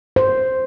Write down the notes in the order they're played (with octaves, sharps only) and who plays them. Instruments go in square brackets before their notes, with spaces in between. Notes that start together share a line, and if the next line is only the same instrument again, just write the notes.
[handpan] C5